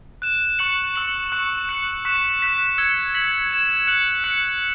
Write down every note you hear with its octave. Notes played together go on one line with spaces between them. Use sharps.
F#6 E7
C#6 F#6 C#7 F#7
C#6 E6 C#7 F#7
C#6 F#6 C#7
F#6 C#7 F#7
C#6 F#6 B6 E7
F#6 B6 E7
E6 G#6 C#7
G#6 B6 F#7
G#6 E7
F#6 C#7 F#7
F#6 C#7 F#7